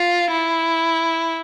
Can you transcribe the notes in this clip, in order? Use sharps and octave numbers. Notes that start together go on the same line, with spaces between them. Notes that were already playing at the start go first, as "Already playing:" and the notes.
Already playing: F4
E4